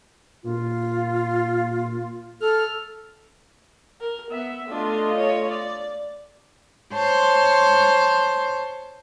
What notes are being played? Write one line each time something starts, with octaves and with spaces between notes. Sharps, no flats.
A#2 F4
A4 F6
A#4
B3 E5
A3 D4 F4 D#5
C#5
D5
C5 C#5 A5 C6